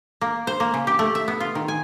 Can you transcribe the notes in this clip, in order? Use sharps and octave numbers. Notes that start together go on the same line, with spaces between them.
A#3
C5
A#3
C#3
G4
A3
E5
B3
F4
D#3
G#5